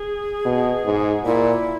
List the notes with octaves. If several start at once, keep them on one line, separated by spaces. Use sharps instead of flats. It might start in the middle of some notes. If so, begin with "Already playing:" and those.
Already playing: G#4
B2
G#2
A#2 E4